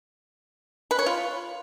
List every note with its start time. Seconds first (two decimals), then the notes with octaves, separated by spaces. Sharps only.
0.91 B4
0.99 C#5
1.06 F4